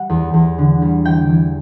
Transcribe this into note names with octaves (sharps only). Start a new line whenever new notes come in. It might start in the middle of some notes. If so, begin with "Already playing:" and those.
Already playing: G3 F#5
E2
E2
D3
G3
E3 G5
E3